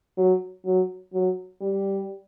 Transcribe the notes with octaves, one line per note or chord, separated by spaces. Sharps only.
F#3
F#3
F#3
G3